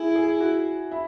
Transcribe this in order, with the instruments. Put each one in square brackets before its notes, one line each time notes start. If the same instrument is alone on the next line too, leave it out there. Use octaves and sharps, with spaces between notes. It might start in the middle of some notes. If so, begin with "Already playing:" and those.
Already playing: [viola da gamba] E4 [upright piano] G#4
[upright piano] G#4
F#4
E4